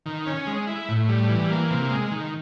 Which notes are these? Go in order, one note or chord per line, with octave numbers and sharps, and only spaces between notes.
D#3
C#4
G#3
E4
A2
G3
E3
A#3
C3
G#3
D#3